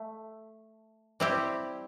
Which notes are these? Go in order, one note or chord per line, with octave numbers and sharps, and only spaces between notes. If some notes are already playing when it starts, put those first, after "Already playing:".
Already playing: A3
G3 C4 E4 G4